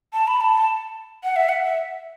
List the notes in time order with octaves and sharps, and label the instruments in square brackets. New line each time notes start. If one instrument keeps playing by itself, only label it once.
[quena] A5
B5
A5
F#5
E5
F#5
E5